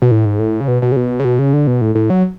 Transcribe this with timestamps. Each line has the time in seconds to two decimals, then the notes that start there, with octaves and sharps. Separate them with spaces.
0.02 B2
0.11 A2
0.25 G#2
0.39 A2
0.60 C#3
0.68 B2
0.82 B2
0.92 C#3
0.96 B2
1.20 C#3
1.25 B2
1.39 C#3
1.53 D3
1.67 B2
1.81 A2
1.95 A2
2.10 F#3